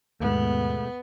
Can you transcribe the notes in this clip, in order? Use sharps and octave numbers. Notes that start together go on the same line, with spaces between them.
D#2 G#2 B2 G#3 A3 B3